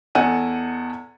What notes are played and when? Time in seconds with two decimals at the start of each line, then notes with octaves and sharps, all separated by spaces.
0.15 E2 A4 D#5 F#5 G#5 D#7